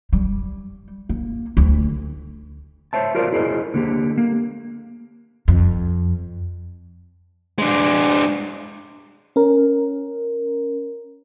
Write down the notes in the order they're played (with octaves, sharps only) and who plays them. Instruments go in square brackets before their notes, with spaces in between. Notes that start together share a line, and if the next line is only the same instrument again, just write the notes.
[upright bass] G3
A#3
D2
[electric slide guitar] C5 C#5 E5 A5
F4 F#4 A#4 C5 D5 F5
E4 G#4 A#4 C5 D#5
D3 A#3 G4
A#3
[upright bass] F2
[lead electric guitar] G#3 D4
[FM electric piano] C#4 A#4